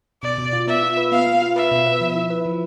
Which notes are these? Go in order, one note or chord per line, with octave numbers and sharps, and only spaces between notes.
B2 D5
B2
F4
B3 E5
F4
B4
B3 F5
B3
F4
B4 E5
B2
B4
F3
E4
B4
F3